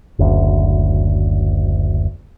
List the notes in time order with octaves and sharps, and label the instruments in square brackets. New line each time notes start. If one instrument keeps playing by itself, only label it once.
[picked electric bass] F#1 D2